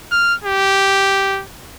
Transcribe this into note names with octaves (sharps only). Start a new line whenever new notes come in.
F6
G4